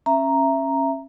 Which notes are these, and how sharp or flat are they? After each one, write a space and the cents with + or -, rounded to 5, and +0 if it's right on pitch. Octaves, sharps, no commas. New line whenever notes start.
C#4 -25 E5 +20 A#5 +0